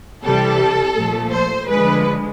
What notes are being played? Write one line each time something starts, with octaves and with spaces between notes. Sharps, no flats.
C3 E3 G3 A4
A#2 F3 A3
C5
D3 F3 G#3 B4